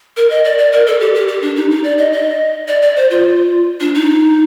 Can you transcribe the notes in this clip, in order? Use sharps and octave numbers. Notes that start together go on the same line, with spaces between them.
A#4
D#5
D5
D5
A#4
A4
G4
G4
G4
D4
D#4
D#4
D5
D#5
D#5
D5
D5
C5
F4
D4
D#4